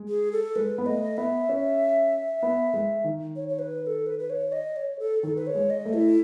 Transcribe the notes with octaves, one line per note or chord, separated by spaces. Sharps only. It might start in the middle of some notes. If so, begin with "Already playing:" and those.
Already playing: G#3
G#4
A4
G#3 B4
B3
A3 D#5
B3 E5
C#4
B3
G#3
D#3
C#5
C#5
B4
B4
A4
B4
B4
C#5
D#5
C#5
A4
D#3 A4
B4
C#5
G#3
D#5
A3
E4